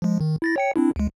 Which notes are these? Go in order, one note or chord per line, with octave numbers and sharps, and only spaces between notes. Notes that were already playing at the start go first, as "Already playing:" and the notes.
F3 G#3
D#3
E4 A6 A#6
C#5 G5 C#7
C4 D4 E4
D2 G#3